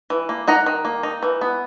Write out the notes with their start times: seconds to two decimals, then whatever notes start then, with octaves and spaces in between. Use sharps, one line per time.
0.10 E3
0.29 A#3
0.48 D#4 F#5 A#5
0.66 D#3
0.85 A#3
1.03 D#4
1.23 E3
1.41 B3